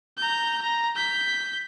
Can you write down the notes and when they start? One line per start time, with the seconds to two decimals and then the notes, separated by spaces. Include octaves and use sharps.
0.18 A#5 G6
0.62 A#5
0.96 G6 B6